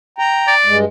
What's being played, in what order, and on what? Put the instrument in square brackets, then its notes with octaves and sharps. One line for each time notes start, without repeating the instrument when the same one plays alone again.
[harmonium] G5 A#5
[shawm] D5
[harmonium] G2 G#3